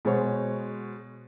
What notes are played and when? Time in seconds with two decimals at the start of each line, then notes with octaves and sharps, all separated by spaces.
0.05 B2 G#3 F#4 C5 C#5